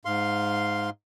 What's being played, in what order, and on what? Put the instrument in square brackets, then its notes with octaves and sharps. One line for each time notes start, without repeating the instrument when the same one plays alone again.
[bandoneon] G#2 F5 C6